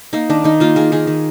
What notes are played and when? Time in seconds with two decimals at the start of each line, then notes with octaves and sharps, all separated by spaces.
0.13 A#3 D#4
0.29 D#3 D4
0.44 D#3 D#4
0.60 A#3 F4
0.76 A#3 G#4
0.92 D#3 G#4
1.07 D#3